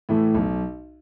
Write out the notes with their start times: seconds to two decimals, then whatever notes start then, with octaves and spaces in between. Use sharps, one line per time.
0.09 A2 E3 A3
0.35 B1